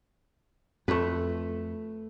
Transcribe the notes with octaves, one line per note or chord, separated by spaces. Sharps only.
F2 A3 B4